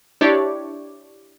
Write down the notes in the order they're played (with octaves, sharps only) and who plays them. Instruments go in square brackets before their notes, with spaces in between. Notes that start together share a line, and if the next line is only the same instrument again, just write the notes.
[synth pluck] D4 E4 G4 C#5 D5